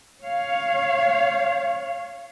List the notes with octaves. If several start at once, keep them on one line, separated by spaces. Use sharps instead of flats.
C#5 F5